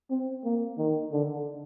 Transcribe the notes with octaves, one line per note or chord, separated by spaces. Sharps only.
C4
A#3
D#3
D3